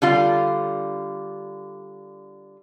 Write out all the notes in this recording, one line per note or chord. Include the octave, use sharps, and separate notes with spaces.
D3 G3 F4